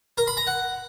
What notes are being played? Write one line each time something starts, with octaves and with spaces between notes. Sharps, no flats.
A#4
B5
A#5
F#5